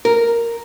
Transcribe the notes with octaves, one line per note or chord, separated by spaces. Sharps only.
A#4